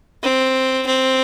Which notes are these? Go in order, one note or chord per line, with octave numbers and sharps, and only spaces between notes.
C4
C4